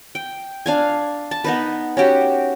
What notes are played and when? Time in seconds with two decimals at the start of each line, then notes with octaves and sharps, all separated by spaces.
0.15 G5
0.66 D4 F5 G#5
1.31 A5
1.44 B3 D#4 B4
1.97 C#4 F#4 G4